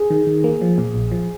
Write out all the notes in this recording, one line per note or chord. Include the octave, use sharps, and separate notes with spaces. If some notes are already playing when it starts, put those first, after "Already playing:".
Already playing: G#4
D#3
D#3
A#3
F3
A#2
A#1
F3